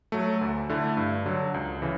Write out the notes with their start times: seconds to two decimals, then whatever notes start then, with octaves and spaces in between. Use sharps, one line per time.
0.12 F#3 A3
0.41 D2
0.69 D3 A3 E4
0.97 G2
1.26 D3 F#3
1.54 C#2
1.82 C#3 E3